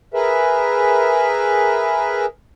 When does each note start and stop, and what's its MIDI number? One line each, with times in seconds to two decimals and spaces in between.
0.14 2.26 68
0.14 2.26 70
0.14 2.26 71
0.14 2.26 76